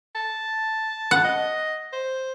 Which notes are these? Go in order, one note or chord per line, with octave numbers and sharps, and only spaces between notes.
A5
F#5
D#5
C5